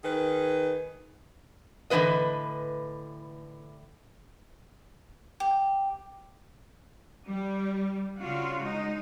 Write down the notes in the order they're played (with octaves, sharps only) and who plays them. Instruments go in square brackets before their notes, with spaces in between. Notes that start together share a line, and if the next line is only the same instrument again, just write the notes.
[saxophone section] D#3 G#4 B4
[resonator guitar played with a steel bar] A2 D3 E3 B3 B4 D#5
[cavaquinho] G4
[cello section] G3
C#3 D4 F4 F#4
G#3 D#4